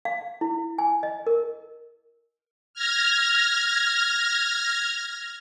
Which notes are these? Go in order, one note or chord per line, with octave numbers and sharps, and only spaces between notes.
F5
E4
G#5
D#5
A#4
F6 G#6 A#6